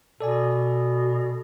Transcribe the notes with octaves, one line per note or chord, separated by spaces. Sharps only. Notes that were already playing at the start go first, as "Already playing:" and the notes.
B2 A4 D5 G#5